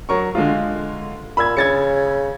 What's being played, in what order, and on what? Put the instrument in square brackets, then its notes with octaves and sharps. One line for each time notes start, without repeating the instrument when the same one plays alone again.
[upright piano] F#3 A#4 C#6
D3 G#3 F4
[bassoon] A#2 [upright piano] B5 E6 G#6
[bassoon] C#3 [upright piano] G#6 A6 C#7